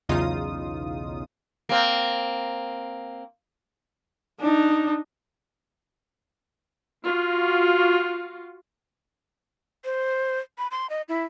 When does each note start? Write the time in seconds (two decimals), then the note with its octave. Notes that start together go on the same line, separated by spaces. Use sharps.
0.09 B1 E2 C#3 D#4 F4 D#6
1.69 A#3 C4
4.40 D4 D#4
7.04 F4 F#4
9.85 C5
10.58 B5
10.71 C6
10.90 D#5
11.09 E4